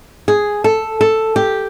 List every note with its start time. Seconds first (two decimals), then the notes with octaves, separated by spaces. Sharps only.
0.28 G#4
0.64 A4
1.01 A4
1.36 G4